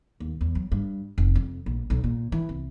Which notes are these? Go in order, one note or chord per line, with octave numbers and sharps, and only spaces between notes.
D#2
E2
F#3
G2
F1
F2
A#1
B1
A#2
E3
C2